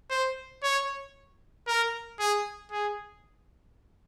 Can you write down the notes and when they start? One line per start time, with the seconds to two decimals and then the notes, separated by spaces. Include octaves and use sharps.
0.10 C5
0.63 C#5
1.67 A#4
2.19 G#4
2.71 G#4